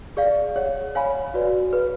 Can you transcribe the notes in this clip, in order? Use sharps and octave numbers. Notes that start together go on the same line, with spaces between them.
G#4 D5 F5
G#4 C#5 F#5
C#5 F5 G#5 B5
F#4 B4 D5
G#4 B4 F5